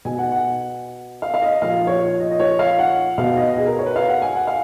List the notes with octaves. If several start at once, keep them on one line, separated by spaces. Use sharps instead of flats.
B2 G#5
F#5
F#5
F5
F5
D#5
A#2 F3 F5
C#5
D#5
D#5
C#5
F5
F#5
B2 F5
D#5
G#4
A#4
C#5
B4
F5
F#5
G#5
F#5
F5